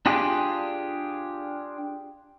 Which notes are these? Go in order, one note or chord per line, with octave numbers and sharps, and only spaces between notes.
D4 F4 G4 G#4